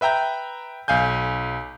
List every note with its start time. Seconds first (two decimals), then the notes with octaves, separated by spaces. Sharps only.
0.01 B4 E5 G5 A#5 G6
0.88 B1 F5 G#5 G6